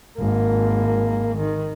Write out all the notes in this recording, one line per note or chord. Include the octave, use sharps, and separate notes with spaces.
G#1 A#3
D#3